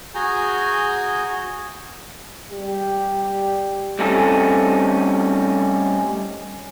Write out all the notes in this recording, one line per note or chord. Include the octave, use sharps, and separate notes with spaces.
F#4 G#4 G#5 A#5 D#6 G6
G3 G4
G3 A3 C4 C#4 D#4 A4